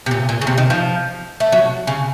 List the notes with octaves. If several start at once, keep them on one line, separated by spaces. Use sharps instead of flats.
C3
A#2
A#2
C#3
C3
D#3
F3
A3
F#3
C#3